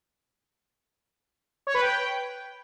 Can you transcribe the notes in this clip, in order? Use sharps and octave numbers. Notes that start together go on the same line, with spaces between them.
C#5
B4
G5